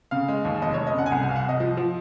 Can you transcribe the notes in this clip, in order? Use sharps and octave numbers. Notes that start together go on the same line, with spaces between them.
C#3 F5
G#3
D#2
F1 D#5
F1 C#5
D#5
C#3 F#5
G#5
C2 F#5
G#5
C2 F5
F#5
C2 D#5
F3
F3